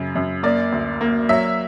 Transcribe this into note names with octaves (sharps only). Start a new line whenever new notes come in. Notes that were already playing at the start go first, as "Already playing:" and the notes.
Already playing: F#2 C#3
F#2
A#3 D5
D2
A#3
F#3 E5